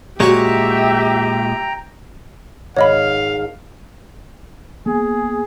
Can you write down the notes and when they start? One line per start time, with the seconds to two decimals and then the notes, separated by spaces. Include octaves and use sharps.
0.20 A#2 G#3 F#4 G4 C#5 E5 G5 A#5
2.76 G#1 C#5 D#5 F5 B5
4.86 A#3 B3 G#4